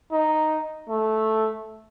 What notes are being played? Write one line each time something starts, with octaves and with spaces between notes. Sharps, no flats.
D#4
A3